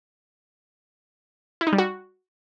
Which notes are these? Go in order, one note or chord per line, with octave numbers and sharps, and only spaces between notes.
E4
D#4
G3
F#4